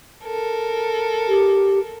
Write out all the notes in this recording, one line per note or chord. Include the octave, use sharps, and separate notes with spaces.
A4 A#4
G4